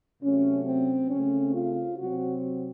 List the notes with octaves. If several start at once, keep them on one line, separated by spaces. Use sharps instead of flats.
C3 F#3 A3 C#4
C4
C#3 A3 C4 C#4
F4
C3 F#3 C4 F#4